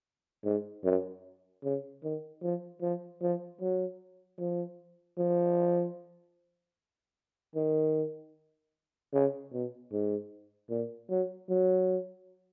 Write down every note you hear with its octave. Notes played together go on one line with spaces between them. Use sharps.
G#2
F#2
C#3
D#3
F3
F3
F3
F#3
F3
F3
D#3
C#3
B2
G#2
A#2
F#3
F#3